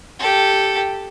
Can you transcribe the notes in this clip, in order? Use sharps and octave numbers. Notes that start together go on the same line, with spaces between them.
G4 A4